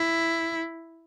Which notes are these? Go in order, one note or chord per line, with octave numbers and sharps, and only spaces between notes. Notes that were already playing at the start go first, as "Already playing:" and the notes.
Already playing: E4